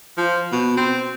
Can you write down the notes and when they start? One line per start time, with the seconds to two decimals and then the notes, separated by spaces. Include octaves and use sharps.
0.18 F3
0.52 B2
0.77 C4